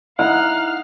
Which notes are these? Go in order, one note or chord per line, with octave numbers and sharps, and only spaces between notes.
D#4 E4 D#5 F5 F#5 F6